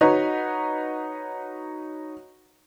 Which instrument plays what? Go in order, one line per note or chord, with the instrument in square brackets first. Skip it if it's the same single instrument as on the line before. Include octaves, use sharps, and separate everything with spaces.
[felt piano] D#4 F#4 B4 C#5